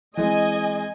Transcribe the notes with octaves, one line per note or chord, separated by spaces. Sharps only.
E3 G#3 C4 D#5 G#5